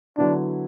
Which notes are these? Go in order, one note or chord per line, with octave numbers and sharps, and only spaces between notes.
D3 F#3 B3 D4 E4